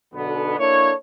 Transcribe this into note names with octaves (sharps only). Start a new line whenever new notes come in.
B1 B2 D3 B3
A#3 D4 E4 A4 C#5